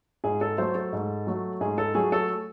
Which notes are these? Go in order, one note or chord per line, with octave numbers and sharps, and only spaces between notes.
G#2 G#4
A4
F#3 A3 C5
A4
G#2
F#3 A3
G#2 G#4
A4
F#3 A3 G#4
A4